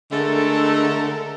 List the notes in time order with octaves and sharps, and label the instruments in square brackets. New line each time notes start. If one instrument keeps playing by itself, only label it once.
[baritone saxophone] D3 [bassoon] G#3 [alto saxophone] A3 [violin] A4 A#4